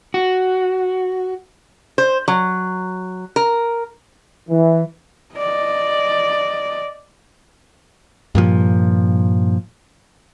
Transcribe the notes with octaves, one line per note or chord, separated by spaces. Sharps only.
F#4
C5
F#3
A#4
E3
D5 D#5
G2 A#2 F3